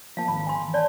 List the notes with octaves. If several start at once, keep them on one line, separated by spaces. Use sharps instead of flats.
F3 A#3 F5 A5
G#1 B5
G#5 C6
E3
C#5 D5 A5